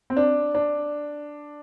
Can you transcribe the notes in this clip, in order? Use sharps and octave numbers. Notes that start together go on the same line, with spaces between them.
C4
D4
D4